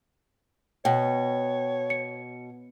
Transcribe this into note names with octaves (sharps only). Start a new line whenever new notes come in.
B2 C#5 G5
C#7